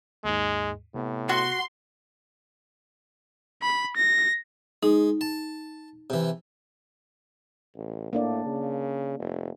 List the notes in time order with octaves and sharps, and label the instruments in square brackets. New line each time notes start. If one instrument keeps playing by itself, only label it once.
[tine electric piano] D#2 G#2 [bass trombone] G#3
[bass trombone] A2 [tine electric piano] C3 B3
[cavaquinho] F#4 [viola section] C6
[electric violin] B5
A#6
[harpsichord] G#3 [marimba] D#4
[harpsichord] A5
C3 E3
[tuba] A1
[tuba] A2 [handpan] A#3 D4 D5
[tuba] C#3
F1